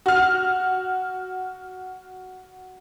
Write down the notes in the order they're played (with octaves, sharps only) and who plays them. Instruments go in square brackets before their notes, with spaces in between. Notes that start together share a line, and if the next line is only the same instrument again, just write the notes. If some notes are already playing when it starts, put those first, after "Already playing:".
[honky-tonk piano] F#4 F6